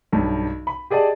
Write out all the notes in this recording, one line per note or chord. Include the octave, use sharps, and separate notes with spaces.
B1 G2
B5
G4 G#4 D5 D#5 A5